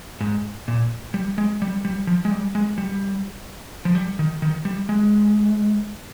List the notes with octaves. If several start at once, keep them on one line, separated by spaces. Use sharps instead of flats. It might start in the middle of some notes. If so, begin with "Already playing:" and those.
G#2
A#2
G3
G#3
G3
G3
F3
G#3
G3
G#3
G3
F3
G3
D#3
D#3
G3
G#3